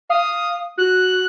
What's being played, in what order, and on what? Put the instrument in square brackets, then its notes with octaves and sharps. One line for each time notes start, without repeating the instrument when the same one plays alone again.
[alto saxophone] F5 [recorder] D#6
[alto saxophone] F#4 [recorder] F#6